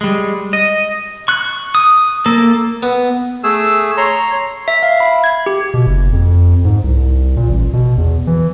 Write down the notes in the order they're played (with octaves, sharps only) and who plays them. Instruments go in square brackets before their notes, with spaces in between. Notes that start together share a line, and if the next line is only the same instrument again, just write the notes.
[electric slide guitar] G3 G#3
D#5
[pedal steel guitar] C#6 F#6
D#6
A#3 A4
[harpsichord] B3
[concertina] A3 G#4 E6
C#5 A#5 C6
[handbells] E5
F5
B5
G#6
G4
[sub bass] B2
F#1
F2
G#2
C2
A#2
A1
B2
E2
E3